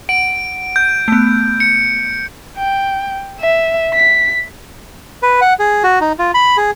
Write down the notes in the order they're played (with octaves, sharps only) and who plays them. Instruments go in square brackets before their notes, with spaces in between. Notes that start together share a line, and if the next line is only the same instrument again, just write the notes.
[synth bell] F#5 [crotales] D7
[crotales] G6
[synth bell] A3 B3
[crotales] C#7
[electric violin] G5
E5
B6
[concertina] B4
F#5
G#4
F#4
D#4
F4
B5
G#4